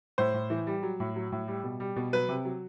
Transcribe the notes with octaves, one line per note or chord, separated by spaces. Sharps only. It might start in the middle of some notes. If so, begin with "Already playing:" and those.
A2 C5
A2
E3
G3
F#3
A2
F#3
A2
G3
B2
G3
B2
F#3 B4
C3
F#3